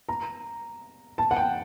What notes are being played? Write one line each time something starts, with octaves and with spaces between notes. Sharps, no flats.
A#5
A5
F#5
G5